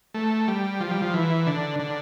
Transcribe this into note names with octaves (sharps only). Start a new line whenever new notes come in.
A3
G3
F3
G3
F3
E3
D3
D3